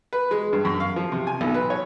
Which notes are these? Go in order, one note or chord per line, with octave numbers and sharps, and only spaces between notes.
B4
G#3
G2
F#2
F5
F3
C3
G#5
B1
B4
C#5